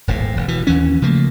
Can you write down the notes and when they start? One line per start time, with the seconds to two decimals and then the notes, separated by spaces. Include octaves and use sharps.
0.07 D#1 G#1 A2
0.36 E1
0.48 B2 E3
0.67 D#2 E3 C#4
1.02 C#3 F3 A3 A#3